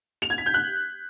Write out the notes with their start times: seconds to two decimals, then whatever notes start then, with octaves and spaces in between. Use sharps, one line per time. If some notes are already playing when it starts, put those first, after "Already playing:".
0.22 F7
0.30 G#6
0.38 B6
0.46 G6
0.54 F#6